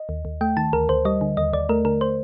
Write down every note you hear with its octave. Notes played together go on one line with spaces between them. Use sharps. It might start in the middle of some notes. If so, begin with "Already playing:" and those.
Already playing: D#5
D#2
D#2
A3 G5
D#3 A5
D2 A#4
D2 C5
G3 D#5
D3
D#2 D#5
D#2 D5
A3 A#4
D3 A#4
C5